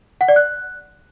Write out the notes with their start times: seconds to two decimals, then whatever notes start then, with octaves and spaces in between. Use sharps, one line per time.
0.21 F#5
0.28 D5
0.36 F#6